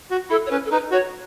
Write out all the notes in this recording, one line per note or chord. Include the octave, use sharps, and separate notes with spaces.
F#4
E4 A4
C#5
C#4 B4
A4
D#4 B4
F#4 C#5